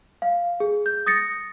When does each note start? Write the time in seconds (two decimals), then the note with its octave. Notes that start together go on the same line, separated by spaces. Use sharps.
0.22 F5
0.60 G#4
0.86 G6
1.06 D#6 A6 A#6 C#7